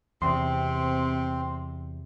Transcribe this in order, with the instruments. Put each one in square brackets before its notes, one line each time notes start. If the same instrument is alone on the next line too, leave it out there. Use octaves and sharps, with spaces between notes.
[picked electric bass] E2 [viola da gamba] C3 [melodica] C4 [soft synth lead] C6